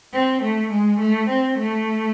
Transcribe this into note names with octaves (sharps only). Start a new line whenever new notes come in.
C4
A3
G#3
A3
C4
A3